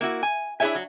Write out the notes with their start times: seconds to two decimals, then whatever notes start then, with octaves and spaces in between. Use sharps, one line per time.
0.01 A#3 E4 F#4
0.23 G#5
0.60 D4 E4 G#4 C#5 E5 G#5
0.75 F#3